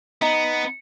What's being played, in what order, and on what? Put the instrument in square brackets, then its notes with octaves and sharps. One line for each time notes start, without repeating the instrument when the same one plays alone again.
[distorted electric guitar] B3 [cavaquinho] D#4